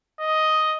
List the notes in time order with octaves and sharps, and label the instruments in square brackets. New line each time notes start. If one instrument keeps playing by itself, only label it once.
[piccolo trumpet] D#5